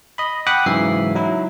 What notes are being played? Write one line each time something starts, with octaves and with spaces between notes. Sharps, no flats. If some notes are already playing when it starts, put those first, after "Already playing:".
D#5 B5
F#5 G5 B5 D6 D#6 F#6
G#2 C#3 E3 F#3 E5 C7
F#3 D#4 E4